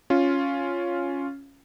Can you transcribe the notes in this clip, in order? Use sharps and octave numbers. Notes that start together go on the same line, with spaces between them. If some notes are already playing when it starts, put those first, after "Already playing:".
C#4 F4